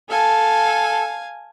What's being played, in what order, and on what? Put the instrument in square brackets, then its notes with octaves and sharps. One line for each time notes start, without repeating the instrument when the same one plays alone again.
[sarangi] A4 [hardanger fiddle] F5 G#5